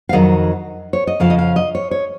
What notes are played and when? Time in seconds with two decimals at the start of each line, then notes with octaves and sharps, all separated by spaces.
0.09 F5
0.13 F2 D#3 F#3 D#5
0.93 C#5
1.07 D#5
1.20 F2 C#3 F3 F5
1.30 D#5
1.38 F5
1.56 D#5
1.75 C#5
1.91 C#5